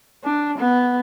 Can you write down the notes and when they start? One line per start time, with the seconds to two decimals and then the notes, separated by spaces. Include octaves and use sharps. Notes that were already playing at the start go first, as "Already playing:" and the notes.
0.24 D4
0.58 B3